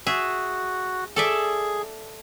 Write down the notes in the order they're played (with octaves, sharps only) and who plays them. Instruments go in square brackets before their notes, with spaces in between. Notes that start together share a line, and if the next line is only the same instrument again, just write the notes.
[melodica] F#4 [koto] G#4 E5
[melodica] G#4 [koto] A4 D5 E5